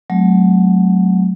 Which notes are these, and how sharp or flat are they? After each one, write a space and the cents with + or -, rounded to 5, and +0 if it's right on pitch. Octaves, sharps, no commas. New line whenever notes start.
F#3 +0 A3 -35 C4 -15